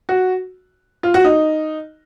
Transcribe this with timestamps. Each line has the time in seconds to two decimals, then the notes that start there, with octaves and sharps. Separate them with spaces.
0.09 F#4
1.03 F4
1.14 F#4
1.24 D#4